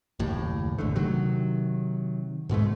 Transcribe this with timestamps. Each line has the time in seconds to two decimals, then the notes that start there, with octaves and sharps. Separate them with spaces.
0.19 F#1 D#2 A2
0.78 D#1 G#1 D3 A3
0.96 C3 D#3 F#3
2.49 G#2 B2 G#3 A3